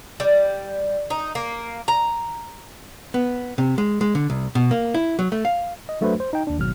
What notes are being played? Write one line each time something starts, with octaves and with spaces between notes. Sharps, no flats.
G3
D#4
A#3
A#5
B3
C3
G#3
G#3
D3
C2
B2
A#3
E4
F#3
A3
F5
D#5
F#3 A3 D4 F#4 B4 C5
C5
D#4 G5
D#2 D4
G#1 G#2 B2 F#3 F6